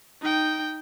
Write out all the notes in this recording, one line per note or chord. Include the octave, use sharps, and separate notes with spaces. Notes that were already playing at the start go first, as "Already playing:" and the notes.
D#4 G5